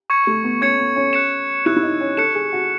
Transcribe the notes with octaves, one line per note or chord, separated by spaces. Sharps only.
C#6 G#6 C#7 E7
A3
B3
C#4 C#6 G#6 C#7 E7
B3
C#4
F#6 C#7 E7
E4 F#6 C#7 E7
E4
D#4
C#4
A4 F#6 C#7 E7
G#4
F#4